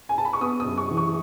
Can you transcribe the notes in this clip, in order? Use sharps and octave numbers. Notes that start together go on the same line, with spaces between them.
G#5
A5
B5
C#6
B3 D#6
D#6
F#2
C#6
E3
C#6